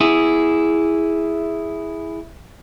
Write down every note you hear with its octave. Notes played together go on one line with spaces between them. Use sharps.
E4 G#4